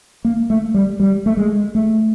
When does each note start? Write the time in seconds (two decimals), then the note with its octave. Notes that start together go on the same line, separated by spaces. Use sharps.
0.25 A#3
0.50 A3
0.74 G3
1.00 G3
1.26 A3
1.37 G#3
1.75 A3